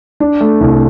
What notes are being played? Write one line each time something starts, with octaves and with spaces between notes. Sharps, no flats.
D4
A3
C2